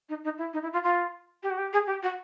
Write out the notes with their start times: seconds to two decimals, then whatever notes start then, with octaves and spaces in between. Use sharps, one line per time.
0.09 D#4
0.24 D#4
0.38 E4
0.53 D#4
0.62 E4
0.73 F4
0.83 F4
1.43 G4
1.50 F#4
1.58 G4
1.73 G#4
1.87 G4
2.03 F#4